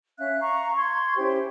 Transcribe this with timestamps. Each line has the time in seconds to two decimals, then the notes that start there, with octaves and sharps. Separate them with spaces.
0.18 C#4 E5 F5 F#6
0.40 F5 A#5 C#6
0.76 C6 C#6 G#6
1.17 C#4 E4 G4 C5